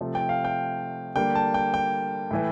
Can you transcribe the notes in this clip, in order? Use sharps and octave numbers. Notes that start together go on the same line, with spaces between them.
C3 F3 A3
G5
F5
G5
D3 G3 A#3 G5
A5
G5
G5
A2 E3 A3